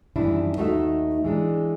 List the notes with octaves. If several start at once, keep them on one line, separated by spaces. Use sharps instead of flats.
F#2 D#3 E3 G3 D4 E4
D#2 A3 D#4 F#4 E5
E3 G#3 D4